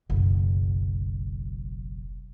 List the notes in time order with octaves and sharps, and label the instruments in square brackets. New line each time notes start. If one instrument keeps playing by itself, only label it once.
[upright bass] F#1 B1